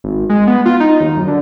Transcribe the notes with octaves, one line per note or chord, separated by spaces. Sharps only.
G#1
G#3
B3
F4
D#4
D#2
F#2
D3